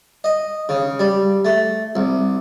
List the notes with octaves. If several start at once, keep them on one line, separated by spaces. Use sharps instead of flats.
D#5
C#3
G3
A3
C2